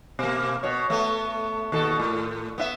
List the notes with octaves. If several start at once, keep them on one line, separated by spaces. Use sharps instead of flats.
B2 A#3
B2 C#5
A3 B3
D#2 B2 A4
A2
B3 E4 E5